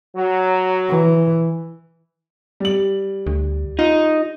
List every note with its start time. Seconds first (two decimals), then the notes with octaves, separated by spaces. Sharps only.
0.16 F#3
0.89 E3
2.60 G3 F#7
3.27 D2
3.79 D#4 F4